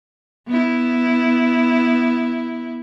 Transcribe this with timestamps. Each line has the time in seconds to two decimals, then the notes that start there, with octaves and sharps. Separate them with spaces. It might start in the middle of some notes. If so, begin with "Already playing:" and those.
0.47 B3 E4